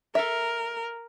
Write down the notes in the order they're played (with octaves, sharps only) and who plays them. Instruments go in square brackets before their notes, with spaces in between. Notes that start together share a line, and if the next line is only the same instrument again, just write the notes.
[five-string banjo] A4 E5 [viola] A#4